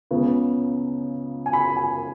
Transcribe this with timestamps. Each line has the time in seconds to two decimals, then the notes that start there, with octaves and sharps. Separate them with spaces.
0.11 C#2 C#3 B3
1.46 G#5
1.53 B5
1.77 G#5